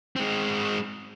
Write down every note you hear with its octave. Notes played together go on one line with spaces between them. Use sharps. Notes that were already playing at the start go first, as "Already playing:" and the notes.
G#3 C4